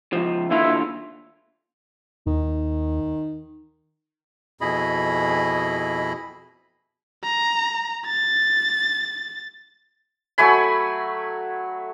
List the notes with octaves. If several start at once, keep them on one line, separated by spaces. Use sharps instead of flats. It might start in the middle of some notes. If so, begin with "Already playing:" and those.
C#2 F3
D#2 D3 E4 F4
D#2 D#3
F2 B2 E4 G#4 D#5 B5
A#5
A6
F#3 A3 G#5 B5